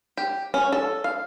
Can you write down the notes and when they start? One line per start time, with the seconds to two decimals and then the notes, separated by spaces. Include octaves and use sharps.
0.17 G4
0.54 C#4
0.72 A4
1.04 F5